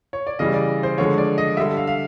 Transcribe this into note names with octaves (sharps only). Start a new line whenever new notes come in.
C#5
D5
C#3 E3 G3 D#5
D5
C5
D3 F3 G#3 C#5
D5
D#5
D3 G3 E5
F5
F5